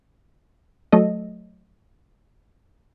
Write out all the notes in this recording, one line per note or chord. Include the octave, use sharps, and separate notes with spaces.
F#3 A3 A4 D#5